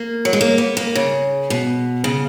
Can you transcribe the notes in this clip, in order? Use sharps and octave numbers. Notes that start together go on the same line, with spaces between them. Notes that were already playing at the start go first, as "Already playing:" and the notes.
Already playing: A#3
F#3
G#3
A#3
B3
A#3
C#3
B2
C#3